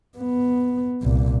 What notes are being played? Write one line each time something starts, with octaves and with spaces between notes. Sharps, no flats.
B3
C2 A#2